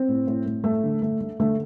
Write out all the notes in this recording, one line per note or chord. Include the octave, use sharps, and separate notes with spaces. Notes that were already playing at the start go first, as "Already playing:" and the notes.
Already playing: C4
A2
A2
A2
A3
D3
A3
A3
D3 A3